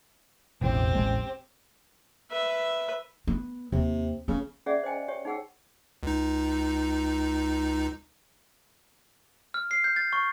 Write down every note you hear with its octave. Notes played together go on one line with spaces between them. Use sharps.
E1 A1 E2 C4 G4
D#1 A1 G#3
B4 E5
B3
D#2 C3
C#3 B3
C#4 G#4 D5 E5 F#5
C5 D#5 G5 G#5
G4 C#5 G5
D#4 G#4 F#5 G5 E6
C#2 D#4
F6
C7
G6
A6
C#6